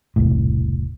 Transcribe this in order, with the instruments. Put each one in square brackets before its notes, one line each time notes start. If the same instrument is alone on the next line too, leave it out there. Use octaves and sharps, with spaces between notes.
[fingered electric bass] E1 C2 A2